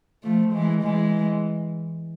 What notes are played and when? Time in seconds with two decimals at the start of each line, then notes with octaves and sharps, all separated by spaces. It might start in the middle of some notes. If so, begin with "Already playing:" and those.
0.23 F3 A3
0.53 E3 G#3
0.82 E3 G#3